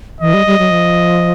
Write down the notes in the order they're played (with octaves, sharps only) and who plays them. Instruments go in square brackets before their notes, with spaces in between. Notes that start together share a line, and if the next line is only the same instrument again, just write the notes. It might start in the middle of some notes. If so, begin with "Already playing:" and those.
[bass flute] E3 [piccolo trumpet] D#5
[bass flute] G3
G3
F#3
F3